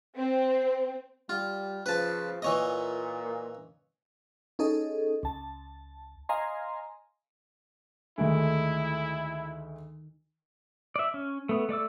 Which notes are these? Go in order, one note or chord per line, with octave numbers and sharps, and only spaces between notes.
C4
G3 F4
C#3 F3 B4 A5
A#2 E3 C#5 D#5
C#4 D#4 G#4 A4 D#5
C#2 A5
D#5 F5 G#5 A#5 C6
D2 D#3 G#3 A3 E4 D7
D5 E5
C#4
A3 B3
A3 D5 D6 E6